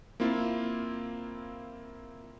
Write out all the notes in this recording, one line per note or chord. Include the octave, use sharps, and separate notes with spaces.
A#3 C4 E4 F4